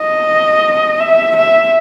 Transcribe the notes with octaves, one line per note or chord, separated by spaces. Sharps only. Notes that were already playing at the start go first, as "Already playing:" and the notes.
Already playing: D#5
E5
E5